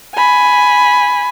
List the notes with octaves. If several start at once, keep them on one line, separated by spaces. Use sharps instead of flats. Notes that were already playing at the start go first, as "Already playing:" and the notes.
G#5 B5